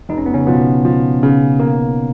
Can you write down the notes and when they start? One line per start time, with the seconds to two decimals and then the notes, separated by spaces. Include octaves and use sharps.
0.09 F1 D#4
0.18 C#4
0.26 B3
0.34 C#3 C#4
0.47 B2 F3 B3
0.85 F3
1.23 C#3
1.60 A#3